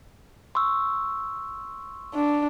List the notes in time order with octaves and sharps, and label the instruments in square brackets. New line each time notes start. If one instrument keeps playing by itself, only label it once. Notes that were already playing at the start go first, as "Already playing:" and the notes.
[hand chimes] C6 C#6 E6
[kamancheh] D4